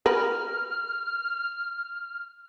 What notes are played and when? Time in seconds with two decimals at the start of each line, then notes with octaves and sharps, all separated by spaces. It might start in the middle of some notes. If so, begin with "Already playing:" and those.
0.06 A#4 B4 F6